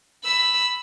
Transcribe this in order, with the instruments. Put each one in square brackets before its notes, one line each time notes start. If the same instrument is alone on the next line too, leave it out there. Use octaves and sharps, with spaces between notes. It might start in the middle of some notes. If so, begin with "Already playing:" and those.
[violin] B5 E6